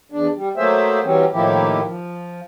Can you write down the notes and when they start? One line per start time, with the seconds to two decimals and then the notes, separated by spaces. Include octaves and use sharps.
0.12 E2 D4
0.36 G3
0.57 F#3 A3 A#3 G#4 C5 E5
1.03 E3 F#3 G3 C4 C#4
1.32 A2 D#3 F3 A#3 E4 G4
1.83 F3